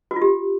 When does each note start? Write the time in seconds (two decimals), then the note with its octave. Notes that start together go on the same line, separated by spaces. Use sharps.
0.11 F#4
0.16 F4
0.22 G4